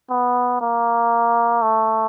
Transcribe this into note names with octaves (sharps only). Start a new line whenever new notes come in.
B3
A#3
A3